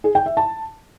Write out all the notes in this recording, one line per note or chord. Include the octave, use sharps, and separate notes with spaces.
G#4
G5
E5
A5